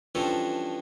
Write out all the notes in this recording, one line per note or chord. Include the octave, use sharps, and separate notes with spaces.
G2 E3 F3 C#4 A4